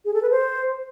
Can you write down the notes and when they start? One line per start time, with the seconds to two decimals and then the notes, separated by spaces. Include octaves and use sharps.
0.05 G#4
0.14 A4
0.22 B4
0.31 C5